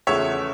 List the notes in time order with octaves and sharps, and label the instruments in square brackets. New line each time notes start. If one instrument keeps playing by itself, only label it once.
[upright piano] E2 C#3 F3 A3 C#5 E5